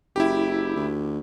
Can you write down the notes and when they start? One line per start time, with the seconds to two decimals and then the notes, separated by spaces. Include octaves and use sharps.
0.16 F#1 E4 G4
0.76 D2